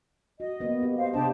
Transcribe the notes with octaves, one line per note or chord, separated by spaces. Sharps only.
F#4 D#5
A#3 B3
G4
C5 F5
C3 D4 G4 D#5 A5